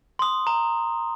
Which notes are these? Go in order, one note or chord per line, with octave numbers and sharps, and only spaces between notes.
C6 D#6
A#5